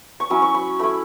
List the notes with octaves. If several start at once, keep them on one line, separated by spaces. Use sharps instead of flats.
C#6
F#3 C#4 E4 B5
C#6
B5
A3 E4 B5